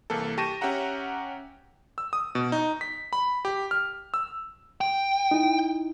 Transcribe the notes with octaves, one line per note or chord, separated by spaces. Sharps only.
C2 E3 A#3 A4
G4 A5 C#6 A#6 D#7 E7
C#4 G4 E5 F#5 A#5
E6
D#6
B2
D#4
B6
B5
G4
F6
E6
G5
D#4 E4